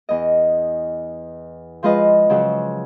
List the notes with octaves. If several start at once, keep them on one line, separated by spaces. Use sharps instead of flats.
E2 D#5
F3 G#3 F4 B4 D#5
C#3 F3 F#3 F#4